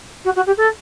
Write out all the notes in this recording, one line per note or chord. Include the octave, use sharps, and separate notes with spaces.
F#4
F#4
G4
A4